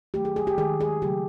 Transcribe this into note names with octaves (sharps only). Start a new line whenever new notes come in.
D#3 F#3 A3 G4
G#4
G#4
G4
D#3 G#3 G#4
G#4
C#3 F#3 A3 G4